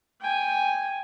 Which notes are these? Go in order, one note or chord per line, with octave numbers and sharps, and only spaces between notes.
G5 G#5